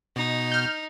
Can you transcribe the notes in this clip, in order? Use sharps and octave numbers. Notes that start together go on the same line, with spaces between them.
B2 D#4
F6 G6